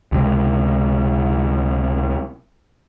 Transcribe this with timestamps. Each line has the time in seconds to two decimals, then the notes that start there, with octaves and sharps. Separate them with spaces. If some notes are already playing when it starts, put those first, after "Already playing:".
0.12 C#2 C3 G#3